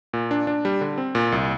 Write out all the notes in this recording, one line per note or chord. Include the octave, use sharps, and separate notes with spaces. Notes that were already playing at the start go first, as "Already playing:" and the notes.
A#2
D4
D4
G3
D3
C4
A#2
C2